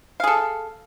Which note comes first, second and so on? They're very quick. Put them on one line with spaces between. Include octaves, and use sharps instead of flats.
F5 G#4 A4